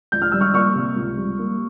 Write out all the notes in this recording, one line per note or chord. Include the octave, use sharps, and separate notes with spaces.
C#2 G6
F6
G3 E6
C#6 F6
A#3 C#6 F6
C3
C#2
G3
A#3